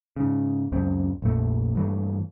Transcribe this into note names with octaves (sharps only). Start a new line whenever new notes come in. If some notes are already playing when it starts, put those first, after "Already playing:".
G#2 C#3
C#2 F#2 C#3 C4
A#1 F2 A3
G2 E3 A3